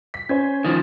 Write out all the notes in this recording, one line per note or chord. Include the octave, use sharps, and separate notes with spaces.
B6
C#4 C5 G#5 G#6
D#3 F3 A6